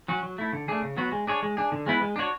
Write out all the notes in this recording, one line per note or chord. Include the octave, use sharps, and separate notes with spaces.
F#3 C#4 F#4
F#3
A3 E4
D3
A3 D4 G#4
C#3
F#3 B3 F#4
G#3
D4 G#4 C#5
G#3
D4 G#4
D3
G#3 B3 E4 B4
G#3
D4 F#4 C#5